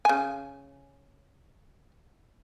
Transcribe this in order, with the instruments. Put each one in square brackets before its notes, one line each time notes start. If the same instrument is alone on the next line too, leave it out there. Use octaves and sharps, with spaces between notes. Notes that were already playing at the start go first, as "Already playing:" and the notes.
[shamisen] C#3 G#5